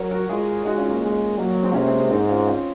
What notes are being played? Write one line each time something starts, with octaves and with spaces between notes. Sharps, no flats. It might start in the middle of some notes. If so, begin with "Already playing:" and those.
Already playing: F#3 A#4 C#5
F#4 A#4
G#3 F4 G#4
G#3 D#4 F#4
C#4 F4
A#3
G#3
F#3 A#3
A#3
G#3 C4
C3 A#3 C#4
G#3 C4
G#3 C4
G#2 C4 D#4
C#4 F4
C#4 F4